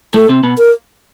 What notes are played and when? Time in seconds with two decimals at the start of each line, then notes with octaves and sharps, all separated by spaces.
0.14 A2 A3 A4
0.29 C3 C4
0.43 B2 B3
0.58 A#4